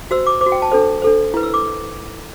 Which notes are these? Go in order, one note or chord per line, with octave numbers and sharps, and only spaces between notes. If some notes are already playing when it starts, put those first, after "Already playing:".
F#4 C5 E6
D6
C5 D6
F#4
G5
A5
D4 A4 C5
D4 A4 C5
E4 B4
E6
D6